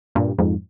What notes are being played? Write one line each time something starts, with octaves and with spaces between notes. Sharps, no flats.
G2 A#2
F2 G#2